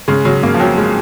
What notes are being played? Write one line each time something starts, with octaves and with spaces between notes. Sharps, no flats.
C#3 G#3
C#3 F#3
C#3 A#3
F3
F2 F#3
G#3